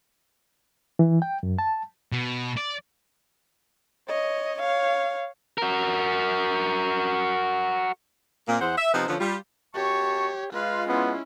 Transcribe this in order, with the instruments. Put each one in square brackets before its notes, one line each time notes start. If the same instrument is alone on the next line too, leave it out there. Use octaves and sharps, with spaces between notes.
[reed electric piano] E3
G5
F#2
A5
[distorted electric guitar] B2
D5
[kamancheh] C#5 D#5
C#5 F5
[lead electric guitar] F#4 A#4
[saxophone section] A#2 A#3 C4
E2 C5 F#5
E5
C3 F3 B3 D#4 C5
D3 F3 B3 C#4 F4 A4
G3 F4
[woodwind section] F#2 A5 C#6 [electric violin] G4 C#5
[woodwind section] G#3 F4 [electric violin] B4 F5
[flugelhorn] B3 [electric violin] C#4 E4